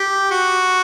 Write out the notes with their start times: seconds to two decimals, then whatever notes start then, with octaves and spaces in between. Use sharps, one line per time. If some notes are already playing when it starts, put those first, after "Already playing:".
Already playing: G4
0.31 F#4